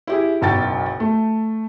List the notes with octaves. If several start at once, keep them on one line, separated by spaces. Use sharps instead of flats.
E4 G4 G#4
F#1 B1 F#4 G5 A6
A3